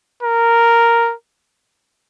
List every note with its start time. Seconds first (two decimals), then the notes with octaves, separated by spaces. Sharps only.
0.23 A#4